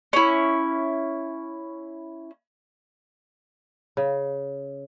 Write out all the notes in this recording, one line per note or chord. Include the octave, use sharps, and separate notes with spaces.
C#4 E4
C#3